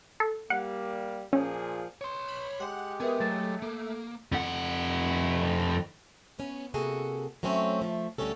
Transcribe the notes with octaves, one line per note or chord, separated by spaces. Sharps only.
A4
G3 A#3 F#5
A#2 F3 C#4 G#4
C#5 C6
B5
G#3 G4 F#5
B3 G#4 A#4 B4 E5
F#3 A3 A6
A#3 A4
F2 F#5
B3 C#4
C3 A#3 F#4 G#4 A4
F#3 A3 C4 C#4
F3 A3
D2 D3 G3 C#4 A4